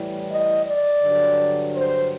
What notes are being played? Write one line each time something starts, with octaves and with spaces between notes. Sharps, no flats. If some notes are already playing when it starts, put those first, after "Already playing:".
Already playing: A2 E3 G3
D#5
D5
G2 D3 F#3
C5